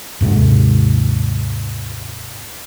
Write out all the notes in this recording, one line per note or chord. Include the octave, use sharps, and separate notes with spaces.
D#2 G#2 C3 G#3